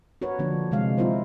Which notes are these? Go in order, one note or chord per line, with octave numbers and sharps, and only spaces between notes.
F#4 A#4 B4 C#5
D3 F3 A#3 D4
C3 E3 G#3 F5
F#3 C4 E4 F4 A#4 C5